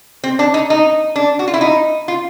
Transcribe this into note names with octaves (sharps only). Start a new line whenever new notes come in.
C4
D4
D#4
D#4
D4
F#4
F4
E4
D#4
F4